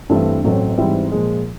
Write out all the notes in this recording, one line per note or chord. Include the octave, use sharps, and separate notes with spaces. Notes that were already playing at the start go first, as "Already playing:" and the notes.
G2 E3 A3 C4 E4
A1 A2 F#3 A3 C4
G#2 E3 G3 C4 E4
A#2 F3 G#3